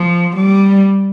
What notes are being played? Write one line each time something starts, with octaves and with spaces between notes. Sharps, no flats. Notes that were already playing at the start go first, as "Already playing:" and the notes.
Already playing: F3
G3